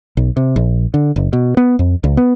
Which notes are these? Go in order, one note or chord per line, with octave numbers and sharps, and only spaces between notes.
B1
C3
A#1
D3
F#1
B2
B3
F2
C#2
B3